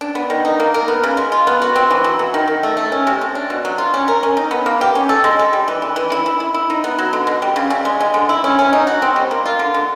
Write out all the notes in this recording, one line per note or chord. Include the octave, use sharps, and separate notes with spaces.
D4
B3
D#3
D#4
A#3
A#4
B3
C#3
G#3
F4
B3
F#4
C4
E3
F#3
F#3
D#3
D#3
A3
A3
C#4
C3
A3
D4
B2
F#3
F4
C#4
A#4
C#4
D#4
B3
A#3
G4
C#4
A4
G#3
A4
G3
E3
E3
E3
E4
E4
E4
E4
D#4
B3
F#3
D3
B2
G3
C#3
C#3
G#3
G#3
D3
E4
C#4
C#4
D#4
F#4
C4
G3
A#3
F4
D3
D3